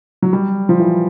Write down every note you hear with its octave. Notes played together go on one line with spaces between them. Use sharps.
F#3
G3
F3
E3